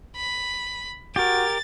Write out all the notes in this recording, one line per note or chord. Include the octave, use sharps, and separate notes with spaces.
B5
F#4 G4 A#4 A6